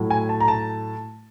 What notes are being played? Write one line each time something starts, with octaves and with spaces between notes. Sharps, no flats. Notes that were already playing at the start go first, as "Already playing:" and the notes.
Already playing: A2 F#3 A3
G#5
A5
A#5
A5